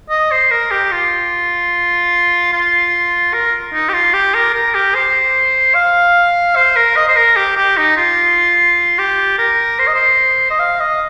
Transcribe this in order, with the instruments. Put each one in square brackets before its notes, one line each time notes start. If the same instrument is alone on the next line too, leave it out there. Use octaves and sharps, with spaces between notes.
[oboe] D#5
C5
A#4
G4
F4
F4
A#4
D#4
G4
F4
G4
A#4
A#4
G4
C5
F5
C5
A#4
D#5
C5
A#4
G4
G4
D#4
F4
G4
A#4
C5
D#5
C5
D#5
F5
D#5